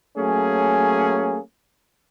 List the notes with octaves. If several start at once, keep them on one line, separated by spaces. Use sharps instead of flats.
F#3 A3 A#3 C#4 G#4